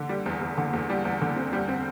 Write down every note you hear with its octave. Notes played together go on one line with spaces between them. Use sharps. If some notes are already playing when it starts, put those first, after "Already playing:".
Already playing: D3
G3
E2
E2
D3
E2
G3
E2
D3
C4
G3
C4